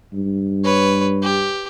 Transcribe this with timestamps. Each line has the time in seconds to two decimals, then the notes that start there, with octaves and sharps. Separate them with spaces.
0.13 G2
0.64 B4 C#5
1.23 G4